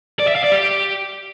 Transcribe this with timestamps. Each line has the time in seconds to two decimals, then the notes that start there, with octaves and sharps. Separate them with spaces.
0.20 D5
0.28 E5
0.36 F5
0.44 D5
0.52 G4